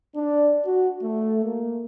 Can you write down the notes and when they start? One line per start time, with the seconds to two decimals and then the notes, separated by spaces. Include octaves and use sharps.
0.15 D4
0.66 F#4
1.02 A3
1.43 A#3